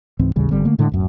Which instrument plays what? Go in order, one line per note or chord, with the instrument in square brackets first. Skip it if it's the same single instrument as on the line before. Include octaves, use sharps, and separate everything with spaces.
[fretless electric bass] C#2 G#2 E3 C4
A1 D#2 C#3 G3
G#1 D3 G3 C4
D3 A3 A#3
A2 D3 G#3
D1 F#2